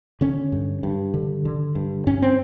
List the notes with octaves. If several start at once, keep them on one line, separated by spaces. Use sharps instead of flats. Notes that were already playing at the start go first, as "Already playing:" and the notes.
D3 C#4
G2
G2
D3
D3
G2
G2 C#4
C4